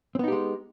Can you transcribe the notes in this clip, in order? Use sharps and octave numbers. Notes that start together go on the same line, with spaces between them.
G#3 B3 C4 D#4 G4